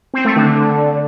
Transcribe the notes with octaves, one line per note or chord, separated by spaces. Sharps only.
C4
A3
D3